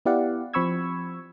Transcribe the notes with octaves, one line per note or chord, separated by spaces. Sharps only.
B3 E4 G4 D5 F5 F#5
F3 C4 B5 C#6 E6 G#6